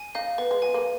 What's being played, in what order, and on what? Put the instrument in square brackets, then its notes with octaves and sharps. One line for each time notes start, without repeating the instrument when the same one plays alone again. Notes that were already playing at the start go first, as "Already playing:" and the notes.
Already playing: [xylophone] G#5
[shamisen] D#4 [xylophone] F5
[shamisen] B3 [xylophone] B4
[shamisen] G#3
[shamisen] F#3 [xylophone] G#5
[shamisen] A#3